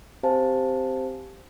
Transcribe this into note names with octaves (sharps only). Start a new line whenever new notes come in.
C4 G4 C5 F5 G#5 A5